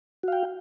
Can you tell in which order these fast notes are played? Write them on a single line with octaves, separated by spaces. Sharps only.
F#4 F5 G5